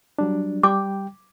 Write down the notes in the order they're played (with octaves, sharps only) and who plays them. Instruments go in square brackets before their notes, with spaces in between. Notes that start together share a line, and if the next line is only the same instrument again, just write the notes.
[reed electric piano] F#3 G3 D4
[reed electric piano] G3 G5 [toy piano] D6